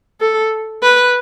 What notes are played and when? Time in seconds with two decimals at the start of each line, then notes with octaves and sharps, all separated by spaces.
0.21 A4
0.83 B4